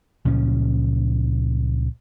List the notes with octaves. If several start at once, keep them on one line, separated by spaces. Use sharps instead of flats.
C#2 A#2 F3 C#4